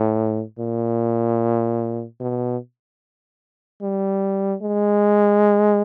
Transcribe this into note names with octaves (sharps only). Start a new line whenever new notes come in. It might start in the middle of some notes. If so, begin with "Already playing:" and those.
Already playing: A2
A#2
B2
G3
G#3